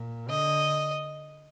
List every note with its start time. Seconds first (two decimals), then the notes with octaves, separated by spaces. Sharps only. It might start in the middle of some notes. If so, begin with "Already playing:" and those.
Already playing: A#2
0.29 D3 D#5